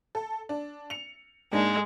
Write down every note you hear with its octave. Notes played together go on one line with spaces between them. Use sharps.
A4
D4
C#7 F7
G#2 G#3 A#3 D4